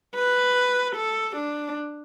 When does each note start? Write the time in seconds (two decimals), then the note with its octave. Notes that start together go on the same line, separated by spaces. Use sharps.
0.15 B4
0.96 A4
1.36 D4